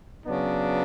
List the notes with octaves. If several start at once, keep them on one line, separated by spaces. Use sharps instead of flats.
C#3 F#3 B3 D4